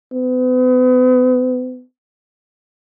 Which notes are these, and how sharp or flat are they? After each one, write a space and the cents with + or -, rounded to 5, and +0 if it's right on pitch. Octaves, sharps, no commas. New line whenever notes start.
B3 +40